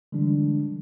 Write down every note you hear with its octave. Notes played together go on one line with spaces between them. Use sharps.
D3 E3 G3 G#3 D4